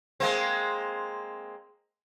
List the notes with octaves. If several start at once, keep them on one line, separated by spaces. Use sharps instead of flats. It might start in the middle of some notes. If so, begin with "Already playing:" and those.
G#3 A#3 C4